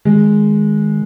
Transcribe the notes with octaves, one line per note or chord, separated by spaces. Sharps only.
D#3 G#3